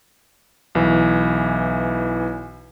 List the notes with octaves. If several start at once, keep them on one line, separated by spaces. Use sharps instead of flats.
B1 E3